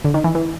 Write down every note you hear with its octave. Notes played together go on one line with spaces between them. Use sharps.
D3
D#3
E3
E3